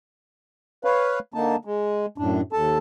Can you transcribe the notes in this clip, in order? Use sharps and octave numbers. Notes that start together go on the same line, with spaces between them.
B4 C#5 F5
D3 A#3 D#4 A5
G#3
F#2 A2 D4
D#2 A4 A5